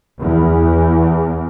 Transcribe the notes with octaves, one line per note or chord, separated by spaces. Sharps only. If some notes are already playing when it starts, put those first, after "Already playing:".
E2